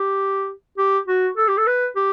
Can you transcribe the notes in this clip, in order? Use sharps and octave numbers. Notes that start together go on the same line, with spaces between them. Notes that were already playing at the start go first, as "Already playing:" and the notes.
Already playing: G4
G4
F#4
A4
G4
A4
B4
G4